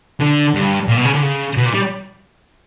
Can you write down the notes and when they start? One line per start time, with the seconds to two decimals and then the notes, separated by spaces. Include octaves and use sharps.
0.21 D3
0.55 G2
0.88 A#2
0.97 B2
1.05 C#3
1.15 D3
1.22 C#3
1.57 B2
1.66 A#2
1.74 G3